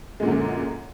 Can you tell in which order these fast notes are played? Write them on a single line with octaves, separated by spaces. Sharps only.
G#3 A#2 D3 F#2